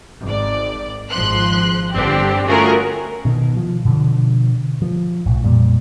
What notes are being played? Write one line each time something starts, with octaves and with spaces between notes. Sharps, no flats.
G#1 D5
G#1 F3 C6 F#6
G1 D3 C4 D4 G4
A3 C#4 F4 F#4 G#4 A#4
B2 D#3
F3
B2 D3 F3
F3
B1 A2
F2 A#2 G3